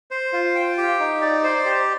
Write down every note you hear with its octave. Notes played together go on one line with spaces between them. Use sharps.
C5
F4
G5
G4
D#4
D5
C5
G4